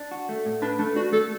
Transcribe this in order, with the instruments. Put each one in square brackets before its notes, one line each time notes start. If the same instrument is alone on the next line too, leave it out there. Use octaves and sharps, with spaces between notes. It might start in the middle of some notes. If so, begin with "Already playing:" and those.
Already playing: [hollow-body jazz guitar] D4
F#4
A3
A2
[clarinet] D4 [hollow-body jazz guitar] B4
[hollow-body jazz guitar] A3 [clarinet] D4
[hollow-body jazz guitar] D4 [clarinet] F#4
[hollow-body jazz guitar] A3 [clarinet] A4